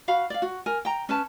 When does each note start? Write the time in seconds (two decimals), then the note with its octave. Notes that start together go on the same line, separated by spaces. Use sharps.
0.08 F#4 F5 B5
0.30 D5 F5
0.42 F#4
0.66 A#4 G#5
0.85 G5 A#5
1.09 C#4 B4 A5